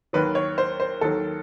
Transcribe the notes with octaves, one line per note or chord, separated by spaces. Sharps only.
D#2 D#3 F#3 B4
C#5
C5
C5
D#2 D#3 F#3 A4